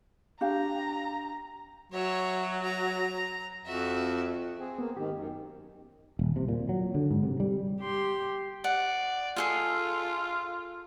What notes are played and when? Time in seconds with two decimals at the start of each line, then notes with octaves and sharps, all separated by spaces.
0.41 D4 G4 F5 A#5
1.92 F#3 C#5 E5
2.64 A#5
3.66 F2 F#4 E5
4.59 C4 G#4
4.78 A#3 B3
4.97 G#2 D#3 G4
5.14 F#2
6.19 D#1
6.36 C3
6.48 A#2
6.69 F#3
6.94 D3
7.10 G#2
7.23 C3
7.40 G3
7.81 G4 C6
8.64 D5 F#5
9.36 F4 G#4 A4 G#5